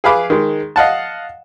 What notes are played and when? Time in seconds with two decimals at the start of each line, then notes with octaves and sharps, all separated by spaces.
0.04 G#4 B4 F5 B5 D6
0.30 D#3 G#3
0.76 D#5 F5 F#5 A5